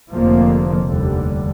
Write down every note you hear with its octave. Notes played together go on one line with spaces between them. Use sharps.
F1 F2 D3 F3 A#3
F1 D#2 D3 G3